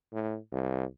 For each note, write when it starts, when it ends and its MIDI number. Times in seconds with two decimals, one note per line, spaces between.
0.13 0.37 45
0.52 0.84 36